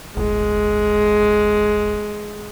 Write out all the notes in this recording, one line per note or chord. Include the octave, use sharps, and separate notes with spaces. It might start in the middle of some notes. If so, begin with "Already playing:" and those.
D1 G1 G#3